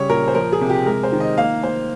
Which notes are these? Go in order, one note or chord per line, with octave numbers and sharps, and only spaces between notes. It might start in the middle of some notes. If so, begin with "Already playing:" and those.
Already playing: C#3 G3 C#5
A#2 A#4
C5
F3 A#4
G#4
C3
G4
G#3 A#4
C5
D#3
D#5
A#3 F5
A#3 C5